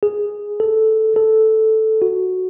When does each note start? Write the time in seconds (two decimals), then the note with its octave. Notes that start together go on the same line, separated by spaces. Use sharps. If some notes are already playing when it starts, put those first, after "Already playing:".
0.03 G#4
0.60 A4
1.16 A4
2.02 F#4